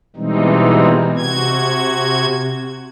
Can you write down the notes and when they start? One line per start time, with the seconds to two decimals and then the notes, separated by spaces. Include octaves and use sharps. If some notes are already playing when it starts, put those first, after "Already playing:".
0.16 B2 E3 G3 G#3 C4 D#4
1.16 C3 F#4 G#6